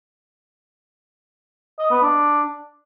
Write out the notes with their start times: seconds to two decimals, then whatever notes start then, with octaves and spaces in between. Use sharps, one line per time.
1.79 D#5
1.91 B3
2.02 D4